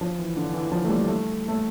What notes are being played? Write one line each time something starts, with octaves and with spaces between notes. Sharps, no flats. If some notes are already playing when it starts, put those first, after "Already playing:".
F3
E3
D3
E3
E3
F3
A3
G3
A3
A3